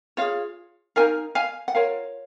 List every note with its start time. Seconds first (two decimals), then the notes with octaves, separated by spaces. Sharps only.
0.17 F4 G#4 C#5 F5
0.96 D#4 F#4 A#4 F5 G#5
1.35 F5 G#5
1.68 F#5
1.75 F4 A#4 C#5 F5